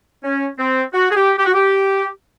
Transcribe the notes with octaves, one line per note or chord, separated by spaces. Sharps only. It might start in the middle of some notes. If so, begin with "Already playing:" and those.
C#4
C4
F#4
G#4
G4
G4
F#4
G4